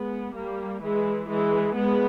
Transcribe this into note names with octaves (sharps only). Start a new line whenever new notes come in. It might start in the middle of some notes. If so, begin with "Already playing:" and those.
Already playing: G#3 B3
G3 A#3
E3 G#3
E3 G#3
G#3 B3